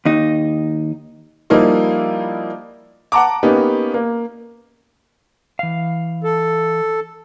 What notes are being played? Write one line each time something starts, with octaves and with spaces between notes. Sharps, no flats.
D#2 D#4
F3 G3 A#3 D#4 E4
F#5 A5 A#5 D6
A#3 B3 C#4 D#4 G4
A#3
E3 F5
A4